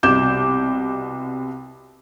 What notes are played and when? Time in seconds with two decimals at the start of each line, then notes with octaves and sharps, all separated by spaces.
0.03 C2 B2 D6 G6 E7